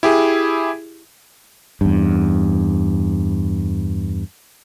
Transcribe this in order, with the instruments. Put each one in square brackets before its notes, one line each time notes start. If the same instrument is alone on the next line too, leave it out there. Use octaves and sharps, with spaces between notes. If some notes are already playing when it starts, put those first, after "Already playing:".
[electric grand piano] E4 G4 G#4
[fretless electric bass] E2 G2